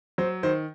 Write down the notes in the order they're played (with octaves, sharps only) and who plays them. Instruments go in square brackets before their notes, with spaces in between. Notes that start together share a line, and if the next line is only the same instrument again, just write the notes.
[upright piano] F#3 [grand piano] C5
[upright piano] D#3 [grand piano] C5